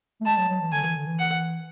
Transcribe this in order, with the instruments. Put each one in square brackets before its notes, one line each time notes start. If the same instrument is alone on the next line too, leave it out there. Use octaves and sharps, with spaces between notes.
[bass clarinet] A3
[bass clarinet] G#3 [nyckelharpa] A5
[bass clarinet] F#3
F#3
E3
[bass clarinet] D3 [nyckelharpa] G#5
[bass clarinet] E3
D3
E3
[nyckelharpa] F#5